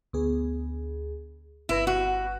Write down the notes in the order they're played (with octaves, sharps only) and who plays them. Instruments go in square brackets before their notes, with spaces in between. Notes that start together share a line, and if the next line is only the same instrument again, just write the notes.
[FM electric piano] D2 B3 G#4
[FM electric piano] G1 B4 A#6 [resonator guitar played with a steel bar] E4
[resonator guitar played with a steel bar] F#4